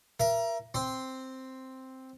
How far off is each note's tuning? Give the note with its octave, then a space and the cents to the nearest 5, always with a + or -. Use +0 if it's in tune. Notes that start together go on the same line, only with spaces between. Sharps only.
A#4 +15 E5 +35
C4 +0 C6 +0